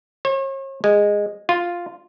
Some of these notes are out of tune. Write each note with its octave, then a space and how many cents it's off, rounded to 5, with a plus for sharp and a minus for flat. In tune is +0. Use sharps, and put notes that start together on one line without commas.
C#5 -40
G#3 -15
F4 +0